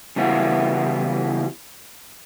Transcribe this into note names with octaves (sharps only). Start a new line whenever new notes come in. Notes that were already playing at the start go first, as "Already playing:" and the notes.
C#3 E3 G3 B3 E4 F#4